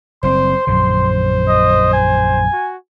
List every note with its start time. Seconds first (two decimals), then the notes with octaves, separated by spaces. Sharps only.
0.23 F#1 G3 C4 C5 C6
0.67 A#1 F#2 D3 C5
1.48 D#5
1.93 G#5
2.53 F#4